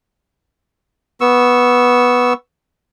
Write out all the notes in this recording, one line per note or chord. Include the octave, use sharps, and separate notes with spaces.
B3 C#6 E6